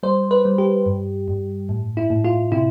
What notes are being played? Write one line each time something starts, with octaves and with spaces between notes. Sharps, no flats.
G3 C5
B4
G3
G4
G2
G2
A2
E4
A2
F4
C3 E4